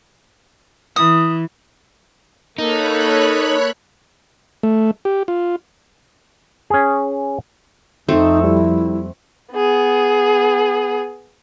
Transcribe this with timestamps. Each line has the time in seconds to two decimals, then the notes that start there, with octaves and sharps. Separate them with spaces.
0.96 E3 D#6
2.58 A#3 D#4 A4 C#5 B5 F#6
4.63 A3
5.05 G4
5.28 F4
6.70 C#4 G#4
8.09 F2 A3 C4 D#4 A4 C5
8.44 G3 E4
9.53 B3 G#4